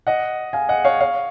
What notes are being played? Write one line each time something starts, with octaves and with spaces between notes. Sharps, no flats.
D#5 F#5
F5 G#5
D#5 F#5
C#5 F5
C#5 F5